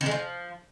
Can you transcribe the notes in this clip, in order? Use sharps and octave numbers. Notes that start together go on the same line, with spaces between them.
D#3
G#3
F3